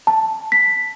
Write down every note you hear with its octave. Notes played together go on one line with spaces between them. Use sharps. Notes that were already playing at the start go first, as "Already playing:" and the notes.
A5
B6